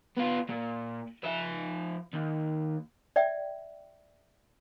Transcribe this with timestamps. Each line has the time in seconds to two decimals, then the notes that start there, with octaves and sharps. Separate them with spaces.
0.17 B3 F4
0.49 A#2
1.24 F3 E5
2.13 D#2
3.16 D5 E5 G5